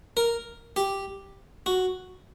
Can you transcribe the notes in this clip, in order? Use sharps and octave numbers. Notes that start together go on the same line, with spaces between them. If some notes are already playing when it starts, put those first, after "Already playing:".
A#4
G4
F#4